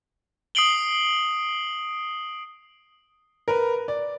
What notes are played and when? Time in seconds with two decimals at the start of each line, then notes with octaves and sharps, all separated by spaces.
0.55 D#6 C7 D7 F#7 G7
3.48 A#4 B4
3.88 D5